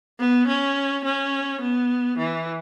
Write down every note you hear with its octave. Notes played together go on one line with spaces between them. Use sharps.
B3
C#4
C#4
B3
E3